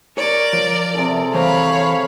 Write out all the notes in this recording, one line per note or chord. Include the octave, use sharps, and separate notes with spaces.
A#4 C#5 D5
F3
C3 G#4 A4
E3 C5 C#5 F5 A#5 B5